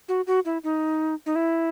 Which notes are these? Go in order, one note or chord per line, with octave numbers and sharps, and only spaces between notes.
F#4
F#4
E4
D#4
D#4
E4